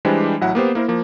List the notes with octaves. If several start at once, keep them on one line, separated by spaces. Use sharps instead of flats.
E3 G3 G#3 D4 G4 C5
A1 F#3 E4 F#5
A#3 B3 G4 C5
A#3 E4 A#4 C5
F3 A#3